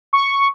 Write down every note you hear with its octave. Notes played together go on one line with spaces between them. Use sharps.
C#6